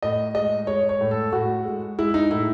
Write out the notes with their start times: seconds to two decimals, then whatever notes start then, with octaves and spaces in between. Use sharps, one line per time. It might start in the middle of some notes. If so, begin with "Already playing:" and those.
0.03 A2 D#5
0.34 G#3 D#5
0.67 G#3 C#5
0.89 C#5
1.01 A2
1.11 A4
1.32 A2 F#4
1.65 G#3
1.98 G#3 E4
2.14 D#4
2.31 A2 E4